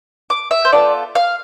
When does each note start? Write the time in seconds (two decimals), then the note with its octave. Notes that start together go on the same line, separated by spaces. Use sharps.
0.30 D6
0.51 E5
0.65 C5
0.72 B3 F4 A4 D5
1.15 F5